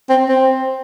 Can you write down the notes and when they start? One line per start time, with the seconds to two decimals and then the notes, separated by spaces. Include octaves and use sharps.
0.09 C4
0.29 C4